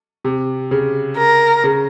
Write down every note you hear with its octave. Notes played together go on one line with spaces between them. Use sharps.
C3
C#3
A#4
C#3